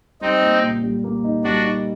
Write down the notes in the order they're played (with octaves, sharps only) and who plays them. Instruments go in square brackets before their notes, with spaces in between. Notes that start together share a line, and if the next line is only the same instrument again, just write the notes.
[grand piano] G3 [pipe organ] C4 D#4
[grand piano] A#3
A#2
G3
A#3
D#4
[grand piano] G3 [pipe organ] D4 F#4
[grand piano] D#4